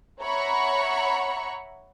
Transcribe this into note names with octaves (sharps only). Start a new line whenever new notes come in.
C#5 E5 F#5 A#5 B5 C#6